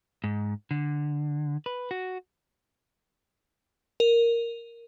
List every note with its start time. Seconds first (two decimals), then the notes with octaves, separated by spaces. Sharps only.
0.24 G#2
0.71 D3
1.66 B4
1.91 F#4
4.00 A#4